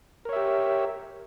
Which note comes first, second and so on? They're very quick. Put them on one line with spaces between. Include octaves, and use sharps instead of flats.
A#4 C#5 E5 G4